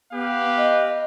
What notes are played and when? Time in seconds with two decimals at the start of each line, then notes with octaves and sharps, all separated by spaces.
0.12 B3 G4 B4 F5
0.58 D#5